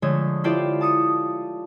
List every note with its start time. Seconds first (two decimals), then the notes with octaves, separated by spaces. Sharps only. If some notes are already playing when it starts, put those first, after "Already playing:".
0.02 D3 F3 G#3 A3 C#5
0.44 E4 F4 G4 A4 C5 D5
0.81 A5 D#6 C#7